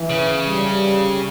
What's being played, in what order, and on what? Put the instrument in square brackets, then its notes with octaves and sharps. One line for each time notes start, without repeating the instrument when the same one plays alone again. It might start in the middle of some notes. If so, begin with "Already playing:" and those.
Already playing: [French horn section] E3
[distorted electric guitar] C#3
[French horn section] G3